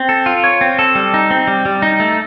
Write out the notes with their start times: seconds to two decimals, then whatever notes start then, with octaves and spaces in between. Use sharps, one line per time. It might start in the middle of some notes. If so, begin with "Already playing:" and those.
Already playing: C4
0.09 A4
0.26 F4
0.44 C#5
0.61 C4
0.79 A4
0.95 G3
1.14 D#4
1.31 C4
1.48 G3
1.65 G3
1.82 D#4
2.00 A3